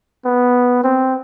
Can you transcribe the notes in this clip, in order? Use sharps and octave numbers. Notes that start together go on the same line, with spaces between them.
B3
C4